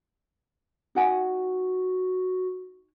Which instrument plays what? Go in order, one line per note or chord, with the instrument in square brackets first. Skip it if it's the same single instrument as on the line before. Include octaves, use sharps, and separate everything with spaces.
[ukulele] D#4 F#5 G#5 [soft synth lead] F#4